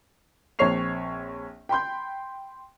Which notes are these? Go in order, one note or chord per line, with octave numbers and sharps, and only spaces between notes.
A#1 C4 C#5 C#6 C7 F7
G5 B5 C6 G6